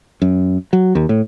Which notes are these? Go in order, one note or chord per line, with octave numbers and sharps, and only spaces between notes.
F#2
F#3
D#2
A2